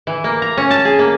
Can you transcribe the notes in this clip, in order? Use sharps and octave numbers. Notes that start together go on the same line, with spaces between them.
E3
A#3
A#5
C#4
A5
G#4
A#3